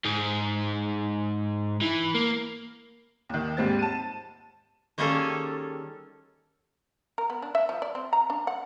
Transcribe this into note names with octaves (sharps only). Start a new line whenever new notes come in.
G#2 D#4
E3
A#3
D#2 D#3
D#2 G#2 G3 C4 A6
A5 D#7
D#3 G3 A#3 C#4 G#4 A4
A#4
B3
D4
E5
F3
D5
C4
A#5
D4
F#5